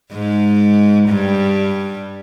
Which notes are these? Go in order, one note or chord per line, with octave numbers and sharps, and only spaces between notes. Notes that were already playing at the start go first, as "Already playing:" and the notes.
G#2 G#3
G2 G3